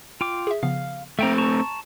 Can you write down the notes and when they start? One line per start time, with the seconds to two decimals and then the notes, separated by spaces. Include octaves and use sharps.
0.21 F4 G5 D6
0.47 G#4 E5
0.63 C#3 F3 B3 F5
1.19 A3 A#3 C4 E5 G5 A#5
1.38 A5 A#5 C#6